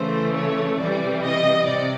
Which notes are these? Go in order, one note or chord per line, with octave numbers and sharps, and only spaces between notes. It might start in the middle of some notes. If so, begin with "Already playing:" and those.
Already playing: C#3 E3 A3 C5
C#5
C3 E3 G3 D5
D#5
C3 D5